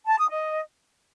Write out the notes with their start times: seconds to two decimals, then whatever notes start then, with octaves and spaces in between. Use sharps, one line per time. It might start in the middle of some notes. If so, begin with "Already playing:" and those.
0.06 A5
0.18 D#6
0.29 D#5